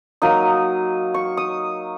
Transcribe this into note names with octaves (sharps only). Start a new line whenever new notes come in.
F#3 A#3 D#4 D#6
C#6
D#6